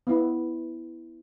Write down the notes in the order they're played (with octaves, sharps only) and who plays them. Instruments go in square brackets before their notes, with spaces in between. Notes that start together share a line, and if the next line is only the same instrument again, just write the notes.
[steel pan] B3 E4